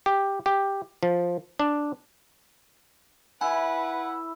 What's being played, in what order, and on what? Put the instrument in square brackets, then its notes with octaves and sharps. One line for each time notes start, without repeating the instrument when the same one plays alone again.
[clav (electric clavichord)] G4
G4
F3
D4
[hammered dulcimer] E4 [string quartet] B4 [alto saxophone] F#5 [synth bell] G#5